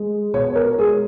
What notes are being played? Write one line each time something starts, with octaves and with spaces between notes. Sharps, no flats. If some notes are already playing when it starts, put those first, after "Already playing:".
Already playing: G#3
B2 C#5
A#4
G#3 G#4